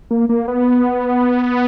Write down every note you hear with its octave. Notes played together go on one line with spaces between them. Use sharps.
A#3
A#3
B3